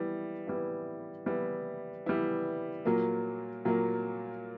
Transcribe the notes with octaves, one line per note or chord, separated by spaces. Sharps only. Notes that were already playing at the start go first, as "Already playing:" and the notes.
Already playing: E3 G3 B3 E4
E3 G3 B3 E4
E3 G3 B3 E4
E3 G3 B3 E4
A#2 F#3 A#3
A#2 F#3 A#3